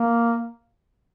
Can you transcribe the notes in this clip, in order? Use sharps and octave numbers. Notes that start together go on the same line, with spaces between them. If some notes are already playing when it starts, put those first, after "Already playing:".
Already playing: A#3